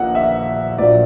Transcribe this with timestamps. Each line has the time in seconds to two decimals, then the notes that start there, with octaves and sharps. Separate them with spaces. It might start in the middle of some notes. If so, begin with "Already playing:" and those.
Already playing: A#1 A#2 A#3 F#5
0.15 E5
0.78 A#1 A#2 F#3 A#3 D5